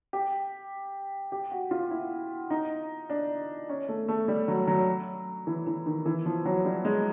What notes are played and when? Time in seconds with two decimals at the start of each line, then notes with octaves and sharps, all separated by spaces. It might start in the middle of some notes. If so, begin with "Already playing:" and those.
0.13 G4
1.32 G4
1.51 F#4
1.71 F4
1.91 E4
2.50 D#4
3.10 D4
3.69 C#4
3.89 A3
4.08 A3
4.28 G3
4.48 F#3
4.67 F#3
5.47 E3
5.67 E3
5.86 D#3
6.06 E3
6.26 F3
6.45 F#3
6.65 G3
6.85 G#3